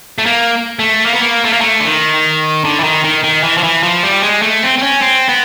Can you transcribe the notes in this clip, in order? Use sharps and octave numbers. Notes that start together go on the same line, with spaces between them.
A3
A#3
A3
A#3
B3
A#3
A3
A#3
A3
D3
D#3
D3
E3
D#3
D#3
D#3
E3
F3
E3
F3
G3
G#3
A3
C4
C4
C#4
C4
B3